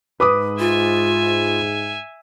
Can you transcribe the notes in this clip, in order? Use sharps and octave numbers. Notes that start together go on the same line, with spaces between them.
G#2 B4 D6 D#6
F4 E5 G#5